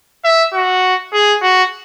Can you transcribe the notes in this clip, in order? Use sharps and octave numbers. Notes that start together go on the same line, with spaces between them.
E5
F#4
G#4
F#4